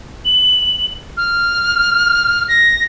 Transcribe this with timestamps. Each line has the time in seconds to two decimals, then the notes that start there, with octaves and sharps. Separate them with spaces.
0.25 F#7
1.17 F6
2.48 A#6